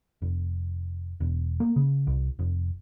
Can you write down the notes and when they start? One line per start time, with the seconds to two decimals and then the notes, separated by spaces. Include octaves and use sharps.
0.22 F1
1.20 E1
1.60 A#3
1.76 C#3
2.07 C2
2.39 F1